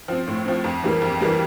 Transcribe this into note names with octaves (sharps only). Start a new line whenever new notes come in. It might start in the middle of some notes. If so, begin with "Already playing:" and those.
F3 C4
A2
F3 C4
F2
E3 G3 A#3
F2
E3 G3 A#3